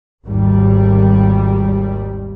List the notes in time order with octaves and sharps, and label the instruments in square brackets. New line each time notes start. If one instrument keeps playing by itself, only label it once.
[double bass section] G#1 D#2 G3